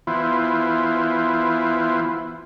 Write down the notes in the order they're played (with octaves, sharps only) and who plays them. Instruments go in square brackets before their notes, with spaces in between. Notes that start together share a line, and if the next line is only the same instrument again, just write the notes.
[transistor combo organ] E3 B3 E4 F4 C5